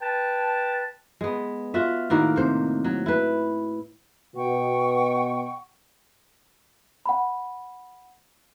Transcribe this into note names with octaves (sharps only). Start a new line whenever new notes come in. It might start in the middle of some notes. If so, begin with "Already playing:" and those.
B4 G5 A5
G#3 B3
F4 F#4 E5
A2 D#3 A#3 F#4
C3 C5
F#3
E4 B4
B2 F#5 G5 C#6
F#5 B5